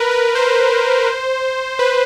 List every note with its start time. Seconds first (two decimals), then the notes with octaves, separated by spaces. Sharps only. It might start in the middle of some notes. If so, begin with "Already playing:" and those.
Already playing: A#4 B4
0.11 B4
0.35 C5
1.79 B4